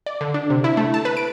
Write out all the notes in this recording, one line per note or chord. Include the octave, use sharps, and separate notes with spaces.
D5
D3
D4
C3
E4
A3
A5
B4
D7